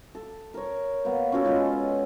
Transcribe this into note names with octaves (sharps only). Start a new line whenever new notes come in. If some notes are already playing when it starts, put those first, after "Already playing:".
A4
A#4 C#5
A#3 B3
C#4 F4 F#4 A4
G#3 F4 A4 D#5